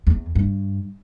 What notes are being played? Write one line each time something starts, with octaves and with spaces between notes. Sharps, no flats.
E2
G2